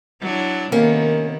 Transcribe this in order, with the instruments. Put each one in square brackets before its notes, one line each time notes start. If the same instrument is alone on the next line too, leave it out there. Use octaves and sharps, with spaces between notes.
[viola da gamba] F#3 D4 E4
[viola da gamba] C3 D#3 B3 [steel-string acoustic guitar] A#3 C#4